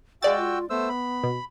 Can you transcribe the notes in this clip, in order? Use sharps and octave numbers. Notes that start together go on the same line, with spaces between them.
G#3 F#4 D5 F5 G5 E6 A6
F4
A3 B3 C5 E6
B5
B2